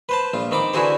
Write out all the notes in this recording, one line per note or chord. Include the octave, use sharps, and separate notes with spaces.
B4 C5 A5
A#1 F4
D#3 C4 B5 D6
D3 E3 E4 F#4 G#4 C5